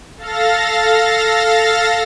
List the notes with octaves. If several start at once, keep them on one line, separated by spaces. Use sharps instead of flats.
A4 F5 A6 A#6